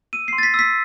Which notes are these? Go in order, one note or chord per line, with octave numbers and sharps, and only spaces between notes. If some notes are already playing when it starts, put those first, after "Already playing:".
E6 D#7
C6 C7
A6
B6
E6 B6